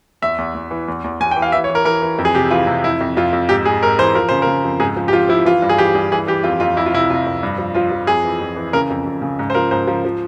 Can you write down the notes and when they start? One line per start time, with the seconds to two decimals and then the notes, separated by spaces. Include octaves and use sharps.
0.22 E2 E5
0.38 E2
0.54 E2
0.71 E3
0.88 E2
1.04 E2
1.20 E2 G#5
1.31 G5
1.36 E3
1.42 F5
1.52 E3 E5
1.64 C#5
1.69 E3
1.75 A#4
1.85 E3 A#4
2.02 E3
2.18 F2
2.25 G#4
2.35 C3 G4
2.51 E3 F4
2.67 C3
2.84 F2 E4
3.00 F2
3.17 F2 F4
3.33 F2
3.49 G#2 G4
3.65 G#2 G#4
3.83 G#2 A#4
3.99 E3 C5
4.15 F3 A#4
4.29 C#3 C5
4.42 A#4
4.47 C#3
4.64 F2
4.80 G#2 G#4
4.96 F3
5.08 G4
5.13 F3 F4
5.29 F3 E4
5.45 E3 F4
5.62 G2
5.69 G#4
5.78 E3 G4
5.95 G2 G#4
6.12 E3 G#4
6.27 E3 G4
6.43 F2 F4
6.60 F2 F4
6.77 F2 E4
6.86 F4
6.93 C3 E4
7.10 C3 F4
7.26 F2
7.43 G2
7.58 F3
7.75 F3 F4
7.91 F3
8.07 F2 G#4
8.24 E3
8.41 F2
8.56 E3
8.73 C#3 A#4
8.90 F2
9.06 F2
9.22 C#3
9.39 G#2
9.50 C5
9.55 F3 A#4
9.71 G#2 C5
9.87 F3
10.05 F3